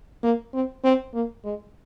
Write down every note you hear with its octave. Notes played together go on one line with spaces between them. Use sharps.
A#3
C4
C4
A#3
G#3